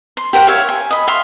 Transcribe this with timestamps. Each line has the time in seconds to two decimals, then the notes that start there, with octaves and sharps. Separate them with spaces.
0.17 C6
0.33 G4 A#4 C5 F#5
0.47 C#5 E5 F5 C#6
0.69 G#5
0.91 D#5 B5
1.07 E5 F5 C6 C#6